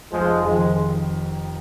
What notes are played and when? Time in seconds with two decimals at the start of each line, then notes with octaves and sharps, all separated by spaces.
0.12 F1 F3 G#3
0.44 F2 D#3 F3 G#3